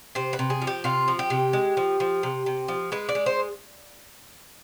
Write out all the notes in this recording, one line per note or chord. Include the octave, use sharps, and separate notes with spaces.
C3 C5
B4
C3
G#4
F3
G4
C3 F4
F3
G4
C3
G#3
F3
F3
C3
C3
F3
G#3 B4
D5
G#3
C5